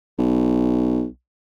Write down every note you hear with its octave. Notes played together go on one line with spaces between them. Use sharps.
B1